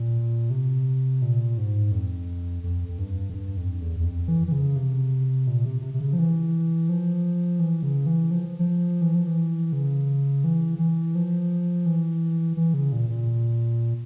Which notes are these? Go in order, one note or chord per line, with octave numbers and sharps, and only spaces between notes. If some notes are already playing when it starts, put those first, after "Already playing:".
Already playing: A#2
C3
A#2
G#2
F2
F2
F2
G2
F2
G2
F2
E2
E2
F2
E3
E3
C#3
C3
A#2
C3
C3
C3
C#3
F3
E3
F3
E3
C#3
E3
F3
F3
E3
F3
E3
C#3
E3
E3
F3
E3
E3
C#3
A#2
A#2